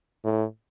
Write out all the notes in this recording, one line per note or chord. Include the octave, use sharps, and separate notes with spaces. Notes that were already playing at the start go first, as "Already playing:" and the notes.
A2